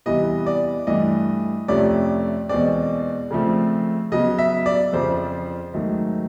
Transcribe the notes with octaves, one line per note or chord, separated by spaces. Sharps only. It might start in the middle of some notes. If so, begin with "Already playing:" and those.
E2 C3 E3 G3 B3 D#5
D5
G2 E3 A3 D#5
F2 C3 F3 A3 C#4 D5
E2 B2 G#3 C4 D5
C#3 F3 A3 C4
C#3 F#3 B3 D#5
E5
D5
F2 C#3 F3 C5
G#2 D#3 F#3 A3